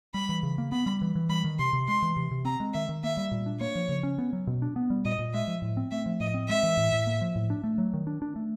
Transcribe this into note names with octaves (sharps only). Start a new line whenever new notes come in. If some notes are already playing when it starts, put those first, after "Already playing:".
G3 B5
E3
C#3
A#3
B3 B5
G3
E3
E3
G3 B5
D#3
C3 C6
C3
G#3 C6
E3
C3
C3
C4 A#5
G#3
D#3 E5
D#3
A#3 E5
G3
A#2
D4
A#3 C#5
F3
C#3
C#4
B3
F#3
B2
D4
B3
G3
A#2 D#5
A#2
G#3 E5
F3
A2
C4
A3 E5
F3
A2 D#5
C4
G#3 E5
E3
A2
A2
A#3
F3
A2
D4
A3
F#3
D#3
D4
D4
A3